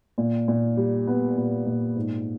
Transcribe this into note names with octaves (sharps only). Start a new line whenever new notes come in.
A#2
A#2
G3
B3
A#2
A#2
G#2